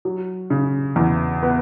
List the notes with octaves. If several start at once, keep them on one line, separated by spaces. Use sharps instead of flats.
F#3
C#3
E2
B3